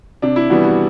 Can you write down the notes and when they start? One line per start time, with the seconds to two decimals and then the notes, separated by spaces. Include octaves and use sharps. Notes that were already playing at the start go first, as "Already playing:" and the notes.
0.22 C3 D4
0.36 E4
0.50 E3 G3 B3 F#4
0.64 F#4